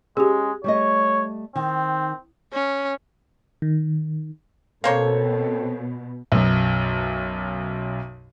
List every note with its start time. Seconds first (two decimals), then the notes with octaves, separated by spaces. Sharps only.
0.17 G#3 C#4 G4 G#4
0.64 G3 A3 C#5 D#5
1.56 D#3 C4
2.53 C#4
3.62 D#3
4.84 B2 A#3 C4 A4 C5 C#5
6.32 B1 F#2